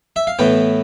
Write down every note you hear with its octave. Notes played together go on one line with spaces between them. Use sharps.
E5
F5
A2 E3 B3 G5